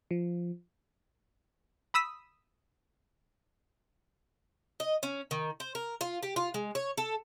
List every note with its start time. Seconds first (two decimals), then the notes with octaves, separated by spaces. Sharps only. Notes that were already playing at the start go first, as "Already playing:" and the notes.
0.11 F3
1.94 B5 D#6 E6 B6
4.80 D#5
5.03 C#4
5.31 D#3
5.60 C5
5.75 A#4
6.01 F4
6.23 G4
6.36 F4
6.54 G#3
6.75 C#5
6.98 A4